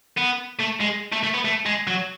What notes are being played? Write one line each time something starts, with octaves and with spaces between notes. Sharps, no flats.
B3
A3
G#3
A3
A3
B3
A3
G#3
F#3